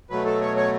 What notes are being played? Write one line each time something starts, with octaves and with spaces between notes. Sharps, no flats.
B2 F#3 A3 B4
A4
C#5
C#5